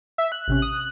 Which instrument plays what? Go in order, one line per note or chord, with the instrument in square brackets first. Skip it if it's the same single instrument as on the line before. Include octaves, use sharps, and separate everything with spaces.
[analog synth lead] E5
F#6
[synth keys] A1 C3 C#4
D#6